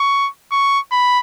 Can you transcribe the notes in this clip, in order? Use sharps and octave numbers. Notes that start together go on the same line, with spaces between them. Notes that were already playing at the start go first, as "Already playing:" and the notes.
Already playing: C#6
C#6
B5